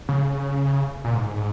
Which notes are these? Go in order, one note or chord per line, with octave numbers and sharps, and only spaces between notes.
C#3
A#2
G#2